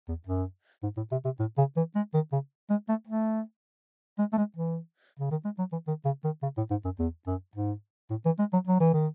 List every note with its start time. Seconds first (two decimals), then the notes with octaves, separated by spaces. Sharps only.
0.09 E2
0.27 F#2
0.83 G#2
0.97 A2
1.12 C3
1.25 C3
1.39 A2
1.58 C#3
1.77 E3
1.95 G#3
2.14 D#3
2.33 C#3
2.70 G#3
2.89 A3
3.07 A3
4.19 G#3
4.33 A3
4.38 G#3
4.56 E3
5.19 C#3
5.31 D#3
5.45 G#3
5.59 F#3
5.72 E3
5.87 D#3
6.05 C#3
6.24 D#3
6.43 C#3
6.57 A2
6.71 G#2
6.85 F#2
6.99 E2
7.27 F#2
7.55 G#2
8.10 A2
8.25 E3
8.39 G#3
8.53 F#3
8.67 F#3
8.80 E3
8.94 D#3